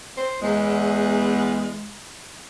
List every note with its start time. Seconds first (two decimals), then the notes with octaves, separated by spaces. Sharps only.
0.17 C5
0.42 E2 G#3